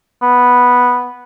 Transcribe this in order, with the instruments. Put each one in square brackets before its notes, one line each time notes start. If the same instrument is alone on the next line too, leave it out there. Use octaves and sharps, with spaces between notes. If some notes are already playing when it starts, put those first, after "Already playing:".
[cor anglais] B3